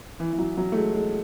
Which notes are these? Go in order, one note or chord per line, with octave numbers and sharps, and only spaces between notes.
E3
E3
F#3
F#3
A3
G#3
G#3